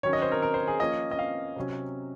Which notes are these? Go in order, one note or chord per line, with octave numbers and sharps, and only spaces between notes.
D#3 F#3 C#4 C#5
D#5
C5
A#4
A#4
C5
G#4
F3 A#3 C#4 D#5
D#5
F5
C3 F#3 C#4